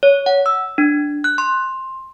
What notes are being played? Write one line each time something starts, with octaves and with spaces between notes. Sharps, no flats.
C#5
F#5
E6
D4
F#6
C6